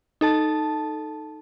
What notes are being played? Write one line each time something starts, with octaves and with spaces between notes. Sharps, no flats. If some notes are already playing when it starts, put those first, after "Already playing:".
D#4 A4 A5